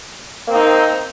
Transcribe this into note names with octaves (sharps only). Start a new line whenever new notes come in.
A#3 C4 D#4